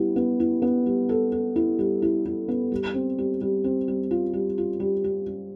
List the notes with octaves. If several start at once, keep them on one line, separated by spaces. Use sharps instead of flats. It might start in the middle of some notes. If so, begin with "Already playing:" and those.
Already playing: G3 B3 E4
B3
E4
B3
G3
A4
A4
E4
G3
E4
E4
B3
G3
C4
G3
G3
C4
G3
F4
G3
F4
G3
G3
G3